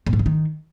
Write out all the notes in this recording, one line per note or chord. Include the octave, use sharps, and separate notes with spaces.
A2
G#2
D3
D#3